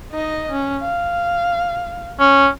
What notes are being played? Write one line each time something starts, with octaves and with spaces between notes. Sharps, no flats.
D#4 D#5
C#4
F5
C#4